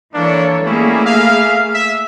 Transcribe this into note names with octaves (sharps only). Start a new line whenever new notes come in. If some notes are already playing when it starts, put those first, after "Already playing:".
E3 A#3 D4 A4 C#5
G3 A3 A#3 C#4 E4 G#4
E5 F5
E5